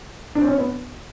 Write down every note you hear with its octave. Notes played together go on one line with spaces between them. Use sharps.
D4
C4
C#4
B3